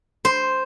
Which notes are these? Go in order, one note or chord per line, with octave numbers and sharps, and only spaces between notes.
C5